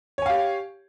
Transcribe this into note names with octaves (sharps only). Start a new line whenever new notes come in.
G4 C#5 F5 G#5